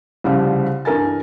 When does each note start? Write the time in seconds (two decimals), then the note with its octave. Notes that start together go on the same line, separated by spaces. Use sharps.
0.24 C2 C#3 F3 G3
0.85 G2 E3 A#4 G#5 A6